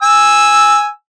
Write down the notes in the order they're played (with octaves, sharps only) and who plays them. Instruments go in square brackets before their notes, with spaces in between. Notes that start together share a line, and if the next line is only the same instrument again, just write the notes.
[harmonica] G#5 E6